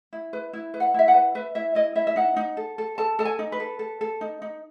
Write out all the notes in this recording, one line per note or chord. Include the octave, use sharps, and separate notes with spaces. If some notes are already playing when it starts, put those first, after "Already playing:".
E4
B4
E4
B4
F#5
E4 E5
F#5
B4
B4 E5
E4 E5
E4 D#5
E4 E5
E5
D#4 F#5
D#4
A4
A4
A4 A5
A4 A5
G#5
D#4
B4
A4
A4
A4
D#4
D#4